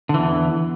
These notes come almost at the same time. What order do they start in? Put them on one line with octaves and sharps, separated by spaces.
D3 E3 E2